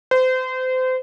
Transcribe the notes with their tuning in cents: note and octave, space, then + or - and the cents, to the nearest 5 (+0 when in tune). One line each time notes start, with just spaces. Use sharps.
C5 -30